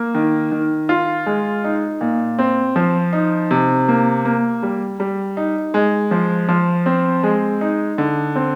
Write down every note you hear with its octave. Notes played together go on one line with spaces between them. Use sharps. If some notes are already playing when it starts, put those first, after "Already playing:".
Already playing: A#3
D#3
D#3
F4
G#3
D#4
A#2
C4
F3
D#4
C3
A#3
A#3
G3
G3
D#4
G#3
F3
F3
C4
G#3
D#4
D3
C4